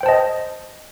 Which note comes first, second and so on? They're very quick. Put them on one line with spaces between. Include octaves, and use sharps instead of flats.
G5 C5 A5 D#5